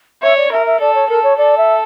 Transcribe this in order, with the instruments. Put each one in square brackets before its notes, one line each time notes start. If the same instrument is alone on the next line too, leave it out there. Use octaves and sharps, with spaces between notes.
[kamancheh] C#5 [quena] E5
[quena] D5
[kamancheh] A#4 [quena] E5
[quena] E5
[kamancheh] A4 [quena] D5
[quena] C#5
[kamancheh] A4 [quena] A#4
[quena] C#5
[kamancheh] A4 [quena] D5
[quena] E5